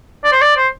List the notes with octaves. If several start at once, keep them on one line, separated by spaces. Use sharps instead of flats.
D5
C5
D5
C5